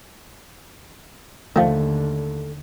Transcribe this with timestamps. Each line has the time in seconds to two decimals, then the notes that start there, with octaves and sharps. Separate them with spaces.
1.56 D#2 D3 D#3 F3 A3